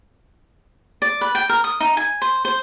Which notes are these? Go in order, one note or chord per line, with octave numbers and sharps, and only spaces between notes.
D5
B4
G5
A#4
D#6
D#4
G#5
C5
C5